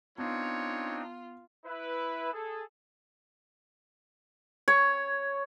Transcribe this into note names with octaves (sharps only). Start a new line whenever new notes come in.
B3 C4 D4 D#4 F4 C#5
E4 B4
G#4 A4
C#5